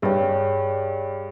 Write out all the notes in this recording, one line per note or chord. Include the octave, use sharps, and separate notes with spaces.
G2 G#4 C#5 G5